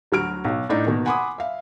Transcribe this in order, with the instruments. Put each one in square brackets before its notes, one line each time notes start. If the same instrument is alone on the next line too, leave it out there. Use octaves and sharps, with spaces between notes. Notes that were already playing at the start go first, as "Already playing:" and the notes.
[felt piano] D2 F#3 F#4 F6 D7
B1
A2 D4 D#4
B2 D#3 A#3
F#5 G#5 B5 C6 D6 D#6
E5 F5